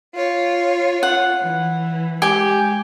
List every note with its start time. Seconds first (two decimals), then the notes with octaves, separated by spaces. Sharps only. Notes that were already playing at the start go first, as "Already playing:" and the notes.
0.14 F4 C#5
1.03 F#5
1.41 E3
2.22 G#3 G4 G#5